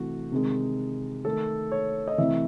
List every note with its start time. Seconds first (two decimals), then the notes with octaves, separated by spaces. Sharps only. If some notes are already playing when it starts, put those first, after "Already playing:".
Already playing: C3 E3 A3 F#4
0.32 C3 D#3 G#3
1.25 D#3 A3 A4
1.72 C#5
2.08 D#5
2.18 C3 E3 A3 E5